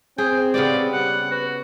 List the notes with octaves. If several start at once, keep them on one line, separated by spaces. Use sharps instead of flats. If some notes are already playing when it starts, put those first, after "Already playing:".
C4 G#4 G5
C#3 B3 G4 D5
G3 F#5
F#4 B4